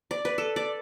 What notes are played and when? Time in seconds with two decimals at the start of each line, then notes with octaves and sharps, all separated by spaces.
0.11 D5
0.25 B4
0.38 A4
0.56 D5